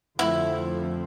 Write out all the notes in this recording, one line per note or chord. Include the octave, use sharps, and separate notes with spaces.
F2 D3 F3 A3 C4 E4